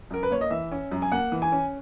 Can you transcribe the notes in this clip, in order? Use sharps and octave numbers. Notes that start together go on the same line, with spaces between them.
F#2 A#4
B4
A#3 C#5
D#5
E3 E5
C#4
F#2
G#5
A#3 F#5
E3
G#5
C#4